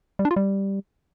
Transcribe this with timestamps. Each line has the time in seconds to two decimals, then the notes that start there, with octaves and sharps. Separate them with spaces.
0.19 G3
0.25 D4
0.31 F4
0.36 G3